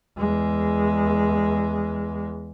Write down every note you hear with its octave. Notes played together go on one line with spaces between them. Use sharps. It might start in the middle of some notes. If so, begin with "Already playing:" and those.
E2 G#3